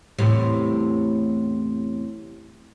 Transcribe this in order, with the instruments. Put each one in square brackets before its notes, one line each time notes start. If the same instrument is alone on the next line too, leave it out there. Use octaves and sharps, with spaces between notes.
[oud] E2 A2 C3